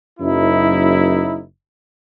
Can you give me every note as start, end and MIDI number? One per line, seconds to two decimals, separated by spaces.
0.20 1.42 30
0.20 1.42 42
0.20 1.42 63
0.20 1.42 64